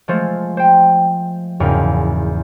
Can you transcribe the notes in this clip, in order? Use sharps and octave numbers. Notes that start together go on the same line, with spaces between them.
F3 G#3 A3 F4 C5
C5 G5
F#1 E2 G#2 F5